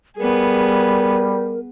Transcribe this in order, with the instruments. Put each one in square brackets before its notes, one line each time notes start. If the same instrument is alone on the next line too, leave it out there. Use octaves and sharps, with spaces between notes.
[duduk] G3 [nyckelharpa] B3 G#4 [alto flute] A#4